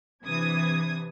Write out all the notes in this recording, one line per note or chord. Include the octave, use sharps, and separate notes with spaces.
C3 E3 D4 D#6 G#6